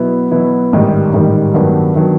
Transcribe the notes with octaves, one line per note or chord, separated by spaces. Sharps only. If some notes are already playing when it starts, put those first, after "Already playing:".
Already playing: B2 F#3 B3 E4
B2 F#3 B3 E4
A1 G#2 D#3 G3
A1 G#2 D#3 G3
G2 D#3 F#3 B3 D4
D#3 F#3 B3 D4